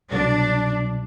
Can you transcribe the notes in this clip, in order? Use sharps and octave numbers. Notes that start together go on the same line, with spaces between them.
C2 B2 F#3 D4